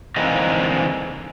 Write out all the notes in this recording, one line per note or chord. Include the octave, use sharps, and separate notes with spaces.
D3 E3 G#3 A#3 C4 D#4